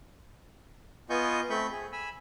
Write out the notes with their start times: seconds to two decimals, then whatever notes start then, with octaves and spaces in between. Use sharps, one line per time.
1.10 B3 F4 D#5 G#5 C#6 G6
1.50 A3 C4 B5 C#6 G6
1.72 G#4
1.92 G#5 B5 E6